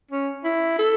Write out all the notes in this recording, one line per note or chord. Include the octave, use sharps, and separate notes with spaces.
C#4
E4
A4